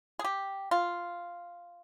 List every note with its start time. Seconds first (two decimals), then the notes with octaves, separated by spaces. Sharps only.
0.19 G#4
0.24 G4
0.71 F4